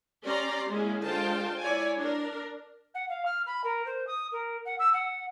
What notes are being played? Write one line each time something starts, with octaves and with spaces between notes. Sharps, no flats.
C#4 G4 D5 A#5 C6
G#3 A#3 C#4 E4 G#4
D3 G#3 F4 C5 G5 A5
E4 C#5 D5 G#5
D4 A#4
F#5
F5
F6
B5
A#4
C5
D#6
A#4
F#5
E6
F#5